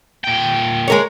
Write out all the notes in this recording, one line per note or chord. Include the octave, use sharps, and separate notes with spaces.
A#2 G5
G#3 A#4 C#5